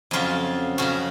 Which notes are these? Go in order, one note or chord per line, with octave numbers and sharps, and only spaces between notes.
F2 C#3 F#3 F4
F2 C#3 F#3 F#4